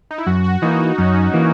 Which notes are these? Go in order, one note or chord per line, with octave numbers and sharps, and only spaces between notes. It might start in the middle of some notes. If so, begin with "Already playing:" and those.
D#4
E4
F#2 F#4
F#4
E3 A#3 D#4
F#2 C#4
E3 A#3